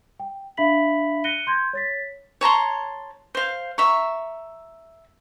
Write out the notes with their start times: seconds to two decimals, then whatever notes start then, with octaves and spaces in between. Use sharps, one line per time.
0.20 G5
0.57 D4 E5 F5 B5 B6 F#7
1.24 F#6 A#6 C#7 D#7 G7
1.47 C6 G6 G#6
1.73 C#5 A6 B6
2.41 C#5 A5 A#5 C6
3.35 C5 F5
3.78 E5 A#5 C#6